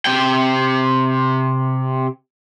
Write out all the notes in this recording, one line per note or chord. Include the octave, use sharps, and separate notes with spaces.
C3 G5